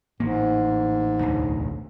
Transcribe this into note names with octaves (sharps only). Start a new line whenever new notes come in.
A1 G#2 A#3
E1 A1 D2